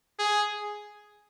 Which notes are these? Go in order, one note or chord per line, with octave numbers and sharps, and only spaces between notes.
G#4